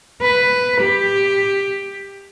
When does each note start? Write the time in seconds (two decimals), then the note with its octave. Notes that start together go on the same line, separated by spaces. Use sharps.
0.22 B4
0.81 G4